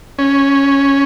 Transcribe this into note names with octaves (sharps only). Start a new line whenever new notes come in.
C#4